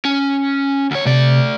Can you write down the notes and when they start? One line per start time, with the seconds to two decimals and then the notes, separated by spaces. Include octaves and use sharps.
0.05 C#4
0.91 D2 C#5
1.06 C3 A3 D5